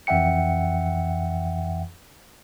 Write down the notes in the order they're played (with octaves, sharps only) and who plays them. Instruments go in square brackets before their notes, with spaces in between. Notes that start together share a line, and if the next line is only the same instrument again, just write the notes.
[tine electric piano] F2 E3 E5 F#5 G5 C#7